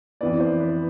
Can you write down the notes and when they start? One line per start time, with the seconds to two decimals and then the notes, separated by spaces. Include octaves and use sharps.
0.21 F2 E3 B3 D5
0.40 C5
0.60 B4